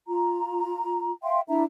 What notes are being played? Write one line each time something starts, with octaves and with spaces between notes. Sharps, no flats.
F4 A#5
E5 F5 G5 C6
D4 E4 E5 A#5